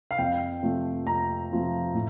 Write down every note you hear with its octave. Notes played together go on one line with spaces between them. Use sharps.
F5
F2 G5
C3 F3 A3
F2 A#5
C3 F3 A3
A2